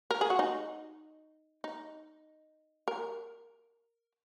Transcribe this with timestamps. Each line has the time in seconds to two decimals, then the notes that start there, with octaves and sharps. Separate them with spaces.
0.11 A#4
0.21 G#4
0.30 F#4
0.39 D#4
1.64 D#4
2.88 A#4